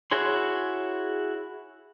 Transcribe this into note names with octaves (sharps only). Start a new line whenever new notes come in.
E4 F#4 G#4 C#5 C6